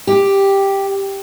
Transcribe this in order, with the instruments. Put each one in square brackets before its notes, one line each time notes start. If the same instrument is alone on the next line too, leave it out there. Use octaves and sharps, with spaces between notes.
[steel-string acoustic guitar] G4